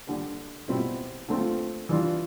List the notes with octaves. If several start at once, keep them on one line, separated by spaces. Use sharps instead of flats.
D3 G3 D4
B2 G3 C4 E4
D3 A3 C4 F4
E3 G3 D4 F4